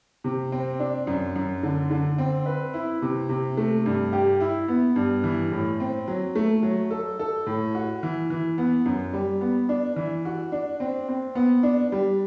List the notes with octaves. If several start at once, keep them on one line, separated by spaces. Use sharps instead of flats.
C3
C4
D4
F#2
F#2
D3
D3
C4
B4
E4
C3
C3
A3
G2
G4
E4
B3
G2
E3
A2
C4
F#3
A3
F#3
A4
A4
A2
F#4
E3
E3
B3
F#2
G3
B3
D4
E3
F#4
D4
C4
C4
B3
D4
G3